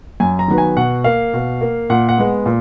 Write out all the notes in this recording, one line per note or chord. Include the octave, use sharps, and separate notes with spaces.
F#2 G#5
A#5
D#3 F#3 B3
G#5
B2 F#5
A#3 F5
B2
A#3
A#2 F#5
F#5
G#3 B3
A#2